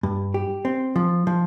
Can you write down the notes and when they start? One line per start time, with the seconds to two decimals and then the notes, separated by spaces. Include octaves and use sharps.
0.03 G2
0.34 G4
0.65 C4
0.96 F3
1.27 F3